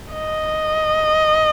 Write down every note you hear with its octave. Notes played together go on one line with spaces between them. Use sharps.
D#5